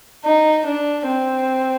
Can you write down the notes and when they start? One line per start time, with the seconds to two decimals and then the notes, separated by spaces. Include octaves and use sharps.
0.24 D#4
0.65 D4
1.06 C4